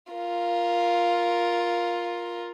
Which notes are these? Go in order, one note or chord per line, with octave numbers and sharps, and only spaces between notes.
F4 A#4